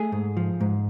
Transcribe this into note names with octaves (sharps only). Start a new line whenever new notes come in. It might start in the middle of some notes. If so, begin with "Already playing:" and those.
Already playing: A3 G#4
G#2
F3
G#2